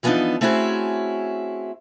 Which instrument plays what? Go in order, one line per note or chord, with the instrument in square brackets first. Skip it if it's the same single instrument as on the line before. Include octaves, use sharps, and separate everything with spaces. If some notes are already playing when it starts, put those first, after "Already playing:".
[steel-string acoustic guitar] E3 F3 A3 B3 D4 D#4
A3 C4 C#4 E4 F#4 G#4